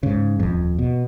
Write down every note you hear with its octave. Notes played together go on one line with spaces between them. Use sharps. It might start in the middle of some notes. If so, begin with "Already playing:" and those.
G#2 C#3
D#1 F2
B2